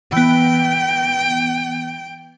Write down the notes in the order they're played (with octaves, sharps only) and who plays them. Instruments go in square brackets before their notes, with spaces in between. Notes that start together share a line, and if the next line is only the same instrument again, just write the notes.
[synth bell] E3 B3 [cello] G5